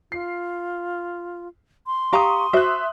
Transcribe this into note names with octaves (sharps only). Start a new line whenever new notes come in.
F4 C7
C6
G4 F5 A#5 C#6 D#6
F#4 C5 E5 F#6